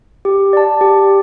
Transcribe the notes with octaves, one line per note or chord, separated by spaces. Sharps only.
G4
D5 A5
G4